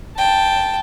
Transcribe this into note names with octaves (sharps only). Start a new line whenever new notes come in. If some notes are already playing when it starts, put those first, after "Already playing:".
G5 A5